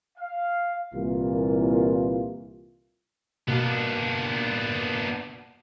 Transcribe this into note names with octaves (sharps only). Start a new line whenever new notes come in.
F5
C2 A#2 E3 A#3 F4
B2 A#3 B3 D4